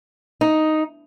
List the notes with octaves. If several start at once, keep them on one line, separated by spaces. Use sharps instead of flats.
D#4